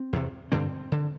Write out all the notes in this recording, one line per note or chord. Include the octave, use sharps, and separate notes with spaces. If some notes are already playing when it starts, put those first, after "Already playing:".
Already playing: C4
E2 C3
G2 D3 C4
D3